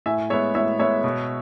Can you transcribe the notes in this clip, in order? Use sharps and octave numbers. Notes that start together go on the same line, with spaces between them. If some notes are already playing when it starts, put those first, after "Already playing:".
A2 E5 G#5
G#3 B3 C#5 E5
A2 C#5 E5
G#3 B3 C#5 E5
B2